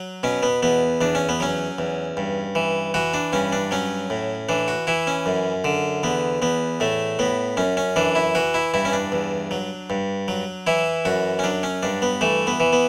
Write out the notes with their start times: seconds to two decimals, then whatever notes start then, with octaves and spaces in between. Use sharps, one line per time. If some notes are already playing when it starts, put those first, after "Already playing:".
Already playing: F#3
0.23 B2 C#4
0.43 B3
0.63 E2 B3
1.01 E2 D4
1.15 C#4
1.29 B3
1.40 F#3 C#4
1.79 E2
2.17 G2
2.55 E3
2.94 E3 F#4
3.14 D4
3.33 G2 C#4
3.53 D4
3.71 F#3 C#4
4.10 A2
4.49 E3 D4
4.68 F#4
4.87 E3 E4
5.07 C#4
5.26 F#2
5.64 D3
6.03 E2 B3
6.42 E2 B3
6.80 A2 A3
7.19 A2 B3
7.57 F#2 C#4
7.77 C#4
7.96 E3 D4
8.15 E4
8.35 E3 F#4
8.54 E4
8.74 G2 E4
8.85 C#4
8.93 D4
9.12 E2
9.51 F#3
9.90 G2
10.28 F#3
10.67 E3 E4
11.05 F#2 F#4
11.39 C#4
11.44 F#3 D4
11.63 C#4
11.83 G2 D4
12.02 B3
12.21 E3 A3
12.47 B3
12.60 E3
12.73 B3